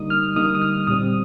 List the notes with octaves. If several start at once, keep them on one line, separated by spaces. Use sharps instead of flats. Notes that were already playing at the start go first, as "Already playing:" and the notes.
Already playing: D3 G3 A#3 D#4 D#6
F6
D3 G3 A#3 D#4 D#6
D#6
F6
A#2 G3 C4 D#6